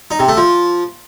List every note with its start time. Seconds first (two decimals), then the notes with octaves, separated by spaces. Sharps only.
0.11 D#4
0.19 C3
0.28 A3
0.37 F3